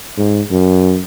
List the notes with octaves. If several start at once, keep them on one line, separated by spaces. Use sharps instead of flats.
G#2
F#2